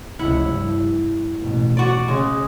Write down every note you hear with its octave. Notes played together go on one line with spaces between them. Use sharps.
F1 C#2 E4 F#5
G2
A1 B2
F#4 D5
C#3 G#3